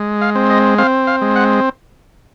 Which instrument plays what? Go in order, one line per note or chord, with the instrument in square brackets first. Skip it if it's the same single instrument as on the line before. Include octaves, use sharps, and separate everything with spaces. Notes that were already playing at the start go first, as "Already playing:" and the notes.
Already playing: [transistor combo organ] G#3
F5
C4
D#5
C4 F5
F5
G#3
F#5